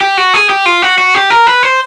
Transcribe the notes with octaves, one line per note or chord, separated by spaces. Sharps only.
G4
F#4
G#4
G4
F4
F#4
F#4
G4
A#4
B4
C5